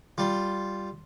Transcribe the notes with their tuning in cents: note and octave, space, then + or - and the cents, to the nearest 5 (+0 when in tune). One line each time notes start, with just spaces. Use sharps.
G3 -5 F4 +0